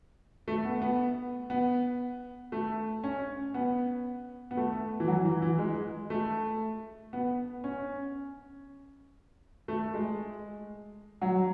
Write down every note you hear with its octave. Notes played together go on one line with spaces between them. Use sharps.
A3
B3
B3
B3
A3
C#4
B3
B3
A3
E3
F#3
E3
E3
G#3
A3
B3
C#4
A3
G#3
F#3